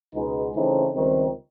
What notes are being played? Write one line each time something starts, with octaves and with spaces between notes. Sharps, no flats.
C#2 B2 G#3 B3 D#4
C#3 E3 A3 C4 D#4
C#2 C3 D#3 G3 C4